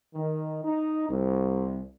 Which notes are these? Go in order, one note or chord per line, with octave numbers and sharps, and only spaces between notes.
D#3
D#4
C2